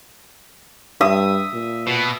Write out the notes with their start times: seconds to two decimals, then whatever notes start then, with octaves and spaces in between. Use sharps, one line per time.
1.01 G2 E5 D#6
1.53 A#2
1.87 B2